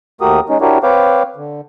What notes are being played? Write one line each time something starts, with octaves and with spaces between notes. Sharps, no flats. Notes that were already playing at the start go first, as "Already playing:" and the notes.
D#2 A3 F#4 G4 A#4 D#6
G#3 C#4 D#4
D4 E4 F#4 G4 A#4 C#5
C4 B4 C#5 F5 G5 D6
D3